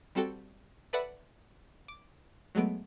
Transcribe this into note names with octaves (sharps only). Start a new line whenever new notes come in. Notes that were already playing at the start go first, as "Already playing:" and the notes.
G3 C4 F#4 A4 G5
A4 B4 D5 E5 F#5 B5
D6
F#3 G#3 A3 B3 D7